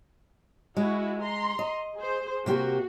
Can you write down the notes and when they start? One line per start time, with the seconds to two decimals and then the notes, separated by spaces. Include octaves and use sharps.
0.77 G#3 E4 F#4
1.22 A#5 C6
1.59 D#5
1.96 G#4 C5
2.46 C3 A#3 F#4 G4